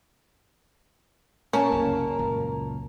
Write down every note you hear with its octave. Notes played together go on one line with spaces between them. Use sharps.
A#3 C#4 A#4 A5
C2 F#2 C#3
C#2 F#2 A#2